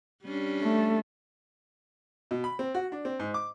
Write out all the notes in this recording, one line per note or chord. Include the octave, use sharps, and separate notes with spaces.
G3 C#4 D4
A3
B2
B5
C4
F#4
D4
C4
G#2
D6